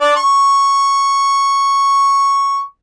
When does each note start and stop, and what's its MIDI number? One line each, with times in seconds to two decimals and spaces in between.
0.01 0.16 62
0.01 0.16 74
0.16 2.59 85